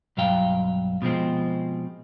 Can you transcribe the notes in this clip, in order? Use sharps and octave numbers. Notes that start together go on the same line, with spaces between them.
B1 G2 F#3 F5 G5
B2 F3 G#3 C4